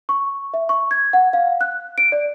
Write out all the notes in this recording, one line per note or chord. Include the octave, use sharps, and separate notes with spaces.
C#6
E5
C#6
G#6
F#5
F5
F#6
D7
D5